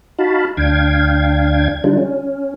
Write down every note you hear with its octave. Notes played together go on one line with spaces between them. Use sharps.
D#4 F#4 F5 A5 B5
D2 D4 F5 G5 G#6
D3 G3 D4 D#4 F4
C#4